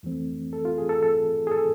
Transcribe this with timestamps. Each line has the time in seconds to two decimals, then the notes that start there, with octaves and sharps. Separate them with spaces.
0.03 F2 E3 A3 C4
0.53 A4
0.65 F4
0.78 G#4
0.89 A4
1.03 A4
1.47 G#4
1.52 A4